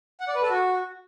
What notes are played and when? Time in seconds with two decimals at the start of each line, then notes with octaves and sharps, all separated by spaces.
0.20 F#5
0.28 D5
0.35 B4
0.42 A4
0.50 F#4